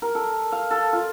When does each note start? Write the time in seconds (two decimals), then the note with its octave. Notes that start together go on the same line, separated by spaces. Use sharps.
0.02 A#4
0.15 A4
0.52 F5
0.71 A4
0.93 F4